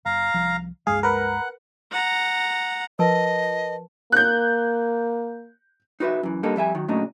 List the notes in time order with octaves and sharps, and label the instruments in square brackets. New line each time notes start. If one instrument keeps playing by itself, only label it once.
[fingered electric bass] F#1 [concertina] F5 A#5
[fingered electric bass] C2 F3
[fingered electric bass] C#2 G2 G#3 [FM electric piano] G#4 [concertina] F5
[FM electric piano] A#4 B4 [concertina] F#5
[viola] F#5 A#5
[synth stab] F3 [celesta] A#4 B4 A5 [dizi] D#5
[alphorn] A#3 [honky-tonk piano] F#6 G6
[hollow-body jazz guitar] D#4 F#4 B4 C5 E5
F#2 E3
G3 A#3 D4 D#4 A4
F2 G3 E5 G#5
D#3 F#3
A#2 C#3 F#3 A3 D4 D#4